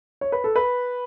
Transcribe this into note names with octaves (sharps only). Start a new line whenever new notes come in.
C#5
B4
A4
B4